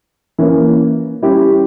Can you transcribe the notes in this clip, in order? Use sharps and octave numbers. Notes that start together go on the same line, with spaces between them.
E3 A#3 C#4
G3 C#4 E4 G4